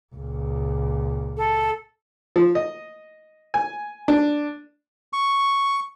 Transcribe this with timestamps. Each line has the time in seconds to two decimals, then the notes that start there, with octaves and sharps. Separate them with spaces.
0.15 C#2 A#2
1.37 A4
2.36 F3
2.55 D#5
3.54 G#5
4.08 D4
5.13 C#6